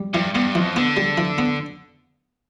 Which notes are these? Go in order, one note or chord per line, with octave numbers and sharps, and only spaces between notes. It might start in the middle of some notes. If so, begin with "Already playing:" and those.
Already playing: G3
G2 E3
G2 B3
F2 E3
D3 B3
G3
E3
B3